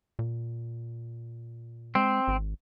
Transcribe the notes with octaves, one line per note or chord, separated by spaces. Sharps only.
A#2
G#3 C4
G#1